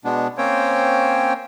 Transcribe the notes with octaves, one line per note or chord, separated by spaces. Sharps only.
B2 G#3 B3 D4
A#3 C4 C#4 C5 C#5 G5